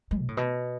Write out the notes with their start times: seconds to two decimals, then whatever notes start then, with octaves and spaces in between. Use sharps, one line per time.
0.11 G#3
0.20 B2
0.28 A2
0.37 B2